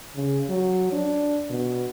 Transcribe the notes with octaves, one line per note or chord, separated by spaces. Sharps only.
C#3
F#3
D4
B2